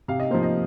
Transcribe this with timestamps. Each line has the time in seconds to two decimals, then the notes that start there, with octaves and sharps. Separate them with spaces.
0.08 C3 F5
0.20 D#5
0.31 F3 A#3 C5
0.43 D#5